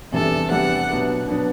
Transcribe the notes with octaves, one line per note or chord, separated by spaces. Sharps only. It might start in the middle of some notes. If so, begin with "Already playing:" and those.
E2 C3 E3 G3 D4 A4
E2 C3 E3 G3 D4 F#5
B2 F#3 B3 D4
B2 F#3 B3 D4